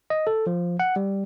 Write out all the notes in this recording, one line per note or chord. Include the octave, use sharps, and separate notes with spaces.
D#5
A4
F3
F#5
G3